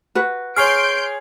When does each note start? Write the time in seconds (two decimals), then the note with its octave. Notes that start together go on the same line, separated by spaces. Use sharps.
0.15 F#4 B4
0.56 G#4 C#5 C6 F6 G6 C7 D7